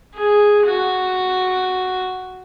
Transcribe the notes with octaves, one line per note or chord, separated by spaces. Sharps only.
G#4
F#4